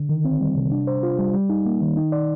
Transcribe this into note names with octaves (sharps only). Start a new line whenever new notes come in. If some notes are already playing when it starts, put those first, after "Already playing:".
Already playing: D3
D#3
C4
G3
C3
D4
C5
F4
G3
G3
D#4
A#3
D#3
D#4
D5